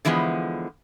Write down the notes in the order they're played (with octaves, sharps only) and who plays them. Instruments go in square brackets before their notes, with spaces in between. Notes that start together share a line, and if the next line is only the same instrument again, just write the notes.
[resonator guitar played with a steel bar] D3 E3 F3 G#3 B3